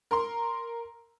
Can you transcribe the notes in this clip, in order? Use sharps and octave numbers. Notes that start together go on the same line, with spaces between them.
A#4 A#5 C6